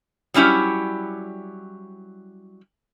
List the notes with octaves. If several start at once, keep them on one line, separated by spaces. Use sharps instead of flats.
F#3 G3 C#4 E4 G4